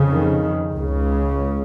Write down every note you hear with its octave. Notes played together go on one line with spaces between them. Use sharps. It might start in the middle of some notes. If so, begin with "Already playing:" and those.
Already playing: F2 C#3
D#3
C#2 C#3